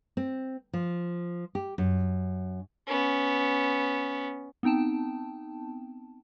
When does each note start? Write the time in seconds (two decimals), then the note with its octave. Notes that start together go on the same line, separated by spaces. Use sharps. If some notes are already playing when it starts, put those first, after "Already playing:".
0.17 C4
0.73 F3
1.55 G4
1.78 F#2
2.87 B3 C#4
4.63 B3 C4 D#4 G5 A5